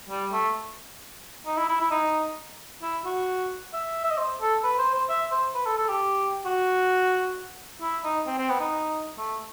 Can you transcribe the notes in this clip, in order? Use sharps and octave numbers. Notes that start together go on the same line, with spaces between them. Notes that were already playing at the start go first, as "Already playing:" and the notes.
G3
A3
D#4
E4
E4
E4
D#4
E4
F#4
E5
E5
D#5
C5
A4
B4
C5
C5
E5
C5
B4
A4
A4
G4
F#4
E4
D#4
C4
C4
B3
D#4
A3